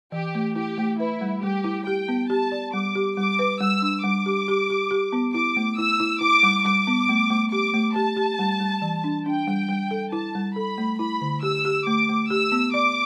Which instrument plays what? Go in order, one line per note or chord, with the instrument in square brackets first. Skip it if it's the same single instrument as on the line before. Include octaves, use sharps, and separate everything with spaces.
[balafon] E3 [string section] G4
[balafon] A3
[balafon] E4 [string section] G4
[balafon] A3
[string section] E4 [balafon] B4
[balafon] G3
[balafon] G3 [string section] G4
[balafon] E4
[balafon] G4 [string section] G5
[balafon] B3
[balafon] G4 [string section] A5
[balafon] D5
[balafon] G3 [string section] D6
[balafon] G4
[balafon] G3 [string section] D6
[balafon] B4
[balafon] G3 [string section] E6
[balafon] D4
[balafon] G3 [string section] D6
[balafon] G4
G4
G4
G4
B3
[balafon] E4 [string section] D6
[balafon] A3
[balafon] E4 [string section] E6
[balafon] E4
[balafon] E4 [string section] D6
[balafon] G3
[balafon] G3 [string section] D6
[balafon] B3
A3
A3
[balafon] G4 [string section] D6
[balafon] A3
[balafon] G4 [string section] A5
[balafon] G4
G3
G3
E3
D4
[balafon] D4 [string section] G5
[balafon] G3
G3
A4
[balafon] E4 [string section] A5
[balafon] G3
[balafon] A4 [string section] B5
[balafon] A3
[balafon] E4 [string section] B5
[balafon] D3
[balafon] G4 [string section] E6
[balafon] G4
[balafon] A3 [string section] D6
[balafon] A3
[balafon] G4 [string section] E6
[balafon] B3
[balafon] D5 [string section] D6